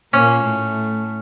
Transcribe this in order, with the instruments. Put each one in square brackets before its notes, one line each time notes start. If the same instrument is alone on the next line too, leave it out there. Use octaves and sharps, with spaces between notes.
[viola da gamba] A#2 A#3 [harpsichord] C#4
[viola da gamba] A2 A3